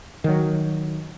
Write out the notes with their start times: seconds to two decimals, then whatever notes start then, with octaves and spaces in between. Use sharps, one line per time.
0.24 D#3 F#3